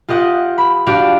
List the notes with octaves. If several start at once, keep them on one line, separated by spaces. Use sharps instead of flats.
F4 G4 D#5 F#5
B5
D4 F#4 G4 D5 F5